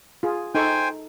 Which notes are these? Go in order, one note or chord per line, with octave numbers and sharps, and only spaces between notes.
F4 G#4
D#4 A4 C5 G5 G#5 C#6